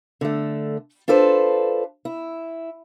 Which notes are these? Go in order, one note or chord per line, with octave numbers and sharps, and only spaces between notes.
D3 A3
D4 F4 A4 B4 C5
E4